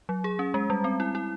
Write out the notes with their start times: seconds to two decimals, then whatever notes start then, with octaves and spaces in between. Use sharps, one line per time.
0.09 F#3
0.24 G#4
0.39 C#4
0.54 G#3
0.70 G3
0.84 C4
1.00 E4
1.15 E4